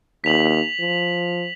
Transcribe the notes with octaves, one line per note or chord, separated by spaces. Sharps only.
D#2 B6 F7 F#7
F3